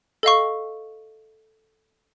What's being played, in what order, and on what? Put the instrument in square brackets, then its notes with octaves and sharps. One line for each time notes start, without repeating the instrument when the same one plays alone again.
[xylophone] A4 D#5 F5 C#6